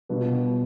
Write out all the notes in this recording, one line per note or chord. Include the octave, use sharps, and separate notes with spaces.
B2 G3 D4 F4 B4